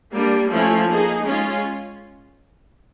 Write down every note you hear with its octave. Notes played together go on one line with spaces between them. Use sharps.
G3 A#3 D4
F3 A3 C#4 E4
A#3 D#4 G#4
G#3 C#4 F4